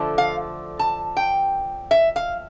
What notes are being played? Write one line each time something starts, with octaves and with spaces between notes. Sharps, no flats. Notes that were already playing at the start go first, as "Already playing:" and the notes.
Already playing: D3 F3 A3
F5
A5
G5
E5
F5